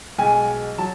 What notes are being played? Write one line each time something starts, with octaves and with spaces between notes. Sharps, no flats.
B1 B2 G#3 G#5
F#3 A5